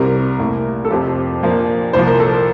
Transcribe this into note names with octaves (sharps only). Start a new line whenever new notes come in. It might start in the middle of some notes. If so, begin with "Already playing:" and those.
Already playing: C2 C3 G3 C4 A#4
C2 A#2 A3
A4
F2 C3 F3 G4
A#2 F3 A#3 D4
C2 A#2 F3 C5
A#4
A4
A#4